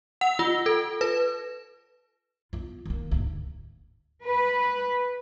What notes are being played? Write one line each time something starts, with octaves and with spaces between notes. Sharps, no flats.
F#5
F4
A4
B4
B3 F4
D#3 A#3
D2 G#2
B4